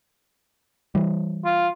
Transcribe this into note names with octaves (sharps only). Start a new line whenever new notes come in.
E3 G3
F4